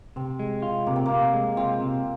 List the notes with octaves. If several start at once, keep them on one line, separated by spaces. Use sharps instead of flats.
C3 C4
G#3
F4
C3 A#3
C4
A#3
C3
G#3
C4 F4
C3